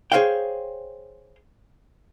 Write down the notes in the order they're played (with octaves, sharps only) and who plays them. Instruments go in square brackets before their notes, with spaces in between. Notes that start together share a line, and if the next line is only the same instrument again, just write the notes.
[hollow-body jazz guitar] G#4 A#4 C5 C#5 F5 G5